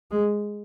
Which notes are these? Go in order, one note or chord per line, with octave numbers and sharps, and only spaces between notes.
G#3